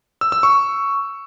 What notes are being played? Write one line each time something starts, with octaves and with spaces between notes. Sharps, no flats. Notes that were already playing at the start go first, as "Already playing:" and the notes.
E6
E6
C#6